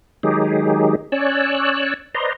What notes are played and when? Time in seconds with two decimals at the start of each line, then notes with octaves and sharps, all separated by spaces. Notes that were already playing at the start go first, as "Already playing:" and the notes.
0.23 D#3 F#3 G#3 D#4 G4 G#4
1.12 C#4 C#5 D5 E6 F#6
2.15 B4 C5 D5 D#5 A#5 C6